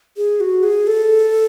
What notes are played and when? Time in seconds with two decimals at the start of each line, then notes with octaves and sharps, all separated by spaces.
0.17 G#4
0.40 F#4
0.63 G#4
0.87 A4